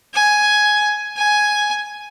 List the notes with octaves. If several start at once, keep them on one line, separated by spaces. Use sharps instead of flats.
G#5
G#5